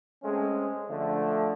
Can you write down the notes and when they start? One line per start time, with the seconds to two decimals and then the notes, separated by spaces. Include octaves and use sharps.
0.23 G#3 A3 C4 C#4
0.89 D3 F3 A3